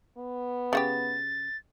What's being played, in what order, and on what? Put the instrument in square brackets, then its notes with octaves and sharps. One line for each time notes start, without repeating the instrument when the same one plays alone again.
[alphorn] B3
[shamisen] C#3 F#4 G4 [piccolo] A6